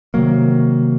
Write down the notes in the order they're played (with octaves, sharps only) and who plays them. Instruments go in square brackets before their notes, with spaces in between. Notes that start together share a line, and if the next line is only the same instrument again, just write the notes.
[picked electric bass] C3 D#3 F#3 A#3